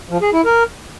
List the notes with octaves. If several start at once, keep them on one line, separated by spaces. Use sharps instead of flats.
F3
G#4
E4
A#4